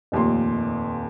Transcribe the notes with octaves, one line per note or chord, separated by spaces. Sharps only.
F1 D#2 A#2 C6